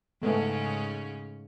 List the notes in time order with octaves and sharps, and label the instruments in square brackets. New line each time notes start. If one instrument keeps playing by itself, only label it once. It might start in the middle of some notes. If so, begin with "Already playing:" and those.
[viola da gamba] G#2 C#3 C#4 [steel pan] G#3 A3 B3